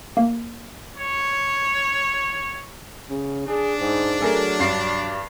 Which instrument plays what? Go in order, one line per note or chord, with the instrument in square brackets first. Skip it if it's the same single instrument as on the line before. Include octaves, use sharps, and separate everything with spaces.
[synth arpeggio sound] A#3
[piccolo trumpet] C#5
[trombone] C#3
[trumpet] D4 [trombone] G#4
[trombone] G#2
[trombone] F#3 [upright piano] A3 G#4 A#4
[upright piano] G2 A6 C7